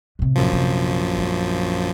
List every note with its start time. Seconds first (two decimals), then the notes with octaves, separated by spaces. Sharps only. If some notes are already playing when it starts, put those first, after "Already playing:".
0.19 A2 C3
0.36 A#1 F#2 F3
0.52 C3
1.18 G#3 C#4